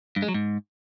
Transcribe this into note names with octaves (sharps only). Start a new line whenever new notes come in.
G2
G#3
F#3
G#2